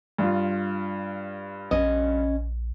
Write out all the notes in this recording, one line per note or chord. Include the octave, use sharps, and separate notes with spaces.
G2 F4
A#1 C#4 D#5